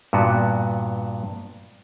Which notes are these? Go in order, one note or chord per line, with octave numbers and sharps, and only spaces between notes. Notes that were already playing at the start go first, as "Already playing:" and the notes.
G2 A#2 B3 F#4